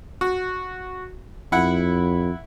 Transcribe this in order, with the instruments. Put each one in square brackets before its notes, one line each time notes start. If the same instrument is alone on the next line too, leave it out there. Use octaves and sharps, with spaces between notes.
[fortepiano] F#4
[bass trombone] F2 [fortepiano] E4 F#5